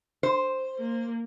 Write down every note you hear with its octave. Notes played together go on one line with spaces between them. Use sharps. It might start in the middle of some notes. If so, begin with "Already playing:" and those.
C5
A#3